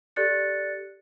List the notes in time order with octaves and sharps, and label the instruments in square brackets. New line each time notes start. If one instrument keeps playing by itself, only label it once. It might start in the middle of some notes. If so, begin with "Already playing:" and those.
[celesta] G4 A4 D5 F#6 A6 C#7